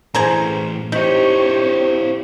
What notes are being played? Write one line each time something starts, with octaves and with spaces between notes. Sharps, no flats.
A2 E3 G#4 C5 A#5
C4 D#4 E4 G4 C5 C#5 D#5